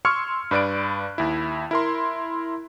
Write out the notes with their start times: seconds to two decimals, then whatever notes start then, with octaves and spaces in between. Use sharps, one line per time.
0.05 C6 C#6 E6 F6 G#6 C#7
0.51 G2 B4 D5 F#6 D7
1.18 D#2 E4
1.71 E4 A#4 C6